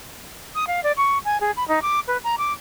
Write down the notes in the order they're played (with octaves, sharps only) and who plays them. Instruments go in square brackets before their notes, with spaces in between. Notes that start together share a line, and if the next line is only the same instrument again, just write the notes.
[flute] D#6
F5
D5
C#6
G#5
G#4
B5
D#4
D6
B4
A#5
D6